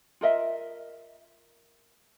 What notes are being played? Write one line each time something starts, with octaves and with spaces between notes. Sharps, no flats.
F4 A#4 D#5 E5